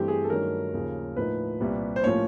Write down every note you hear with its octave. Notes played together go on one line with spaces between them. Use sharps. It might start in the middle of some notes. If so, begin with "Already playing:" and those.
Already playing: G2 E3 A3 C4 G4
G#4
A4
G2 D#3 F#3 A3 C#4 A#4
D#2 C#3 F3
A2 F3 A#3 D#4 B4
C2 A#2 G3
C5
A2 F3 A#3 C#4 C#5